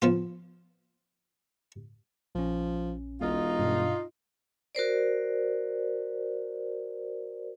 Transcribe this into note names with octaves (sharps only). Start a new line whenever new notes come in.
F3 B3 F4
A#1 F3 C#4
E1 D#4 F4
G2 B2 D4
F#4 A#4 C5 D5